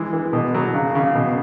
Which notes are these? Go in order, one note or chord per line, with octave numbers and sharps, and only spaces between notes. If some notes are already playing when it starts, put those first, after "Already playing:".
Already playing: E3 G#3
E3
B2
F#3
C#3
C#3
B2